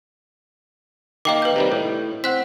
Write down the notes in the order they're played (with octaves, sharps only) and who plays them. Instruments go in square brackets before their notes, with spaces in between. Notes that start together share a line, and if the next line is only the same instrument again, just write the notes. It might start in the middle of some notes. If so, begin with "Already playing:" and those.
[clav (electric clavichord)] D#3 A#3 [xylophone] D#5 G5 D6
[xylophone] B4 G6
[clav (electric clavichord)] C3 D#3 G3
A2
[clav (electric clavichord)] C4 [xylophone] F#5 F#6 B6